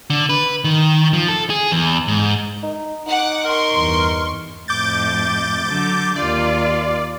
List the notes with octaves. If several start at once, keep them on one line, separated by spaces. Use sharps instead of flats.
D3
B4
D#3
F3
A4
G#4
E2
G#2
D#4
D#4 F#5 D6
A#4 C6 C#6
E2 G2
F2 A2 D6 G6 A6
D3 F#3
D#2 F4 D5